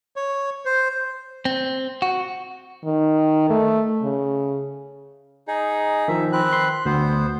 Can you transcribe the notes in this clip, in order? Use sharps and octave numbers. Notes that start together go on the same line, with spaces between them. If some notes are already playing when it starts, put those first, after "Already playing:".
C#5
C5
C4
F#4
D#3
A3
C#3
D#4 G#4
D#3 F3 E5
C4 B4 F#6
C6
D2 B3 C5